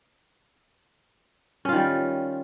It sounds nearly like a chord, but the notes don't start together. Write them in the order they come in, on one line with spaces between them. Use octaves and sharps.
C#4 F4 D#3 G3